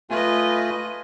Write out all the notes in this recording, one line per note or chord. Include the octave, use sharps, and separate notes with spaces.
A3 F4 B4 D#5 G#5